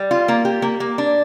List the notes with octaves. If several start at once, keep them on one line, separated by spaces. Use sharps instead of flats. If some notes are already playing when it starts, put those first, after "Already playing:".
Already playing: G3
F4
A#3
G4
A#3
A#3
D4